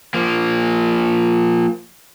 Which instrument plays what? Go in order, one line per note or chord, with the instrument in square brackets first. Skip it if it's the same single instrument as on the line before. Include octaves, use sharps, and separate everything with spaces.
[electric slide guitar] F3 A#3